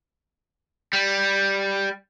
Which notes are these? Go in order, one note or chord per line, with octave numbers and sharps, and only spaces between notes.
G3